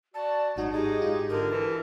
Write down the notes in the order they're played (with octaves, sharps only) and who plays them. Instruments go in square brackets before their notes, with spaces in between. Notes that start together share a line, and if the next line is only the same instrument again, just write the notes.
[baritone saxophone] F#4 [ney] D5 [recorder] A5
[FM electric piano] G#1 G#2 F#4 [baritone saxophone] F#3 [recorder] D#4
[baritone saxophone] G#3 [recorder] D#4 [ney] G4
[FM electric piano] G#2 F4
[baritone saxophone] D3 [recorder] A#4
[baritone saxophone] E3 [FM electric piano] A5